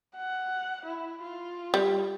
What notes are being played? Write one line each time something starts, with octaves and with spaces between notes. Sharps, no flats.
F#5
E4
F4
G3